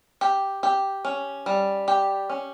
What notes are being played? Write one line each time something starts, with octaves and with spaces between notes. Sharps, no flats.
G4
G4
C#4
G3
G4
C#4